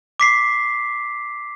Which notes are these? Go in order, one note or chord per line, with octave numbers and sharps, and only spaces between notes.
D6 B6 C7